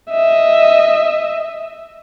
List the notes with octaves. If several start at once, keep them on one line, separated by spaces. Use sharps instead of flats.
D#5 E5